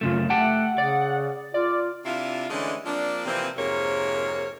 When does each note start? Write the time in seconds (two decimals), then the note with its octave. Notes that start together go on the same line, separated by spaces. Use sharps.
0.01 F#2 C#3 A3 F4
0.30 A3 G4 F#5 G5 A5
0.78 C#3 D5
1.54 F4 D5
2.05 C3 D4 E4 F4
2.50 D3 E3 G#3 A3 C#4 D4
2.85 F3 A#3 C4 D4
3.25 C3 E3 F3 A#3 C4
3.56 F2 G#2 C3 A#3 A#4 C#5